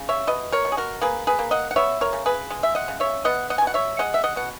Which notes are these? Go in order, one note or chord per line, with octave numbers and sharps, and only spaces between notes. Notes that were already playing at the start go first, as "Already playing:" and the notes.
Already playing: C#3
C#5 E5
B2 B4 D#5
A#4 C#5
B2
G#4
F#4 A#4
A#3 G#4 B4
G#4 B4
A#3
D#5 F#5
F#5
B3 C#5 E5
A#4 C#5
C#3
G#4 B4
G#3
E5
D#5 F#5
C#3
C#5 E5
B3 D#5 F#5
D#5 F#5
G#5
B2
F#5
C#5 E5
G#3 D#5 F#5
E5
D#5 F#5
B2 F#5